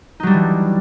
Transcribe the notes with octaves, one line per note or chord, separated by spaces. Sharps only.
E3 F#3 G3 D4 D#4